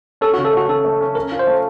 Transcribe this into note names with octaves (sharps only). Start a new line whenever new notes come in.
C#4 A4
F#4
C#3
A4
A3 F#4
C#3 A4
A3
C#4
C#4 A#4
F4
C5
A3